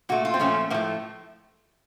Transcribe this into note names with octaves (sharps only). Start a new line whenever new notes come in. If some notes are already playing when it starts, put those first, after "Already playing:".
A#2 A3 F#4
F4
C4
A#2 F3 A3 C#4
A2 F3 A3 A#3